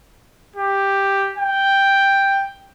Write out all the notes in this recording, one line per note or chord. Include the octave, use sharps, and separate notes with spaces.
G4
G5